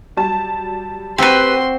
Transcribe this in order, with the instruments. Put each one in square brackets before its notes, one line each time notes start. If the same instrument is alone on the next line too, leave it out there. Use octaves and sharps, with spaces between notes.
[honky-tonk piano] F#3 G3 A5
[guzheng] C4 F#4 C5 [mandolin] G4 B4 [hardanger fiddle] C6